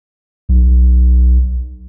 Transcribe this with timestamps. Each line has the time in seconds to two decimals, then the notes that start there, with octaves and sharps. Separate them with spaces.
0.49 B1